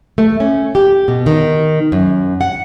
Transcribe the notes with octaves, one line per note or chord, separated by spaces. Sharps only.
A3
C#4
G4
B2
D#3
F#2
F#5